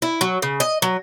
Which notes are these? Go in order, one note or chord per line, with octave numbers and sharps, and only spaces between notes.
E4
F#3
C#3
D#5
F#3